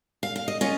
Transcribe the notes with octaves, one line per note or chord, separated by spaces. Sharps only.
F5
F5
D#5
C#4 F4 D#5